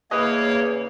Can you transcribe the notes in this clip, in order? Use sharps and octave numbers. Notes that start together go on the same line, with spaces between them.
E2 C#3 A#3 B4 C#5 D#5